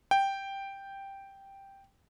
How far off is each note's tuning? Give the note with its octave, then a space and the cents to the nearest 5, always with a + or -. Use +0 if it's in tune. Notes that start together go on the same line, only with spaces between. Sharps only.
G5 +0